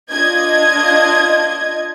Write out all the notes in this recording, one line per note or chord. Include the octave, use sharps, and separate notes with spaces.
D4 F4 D#5 G#6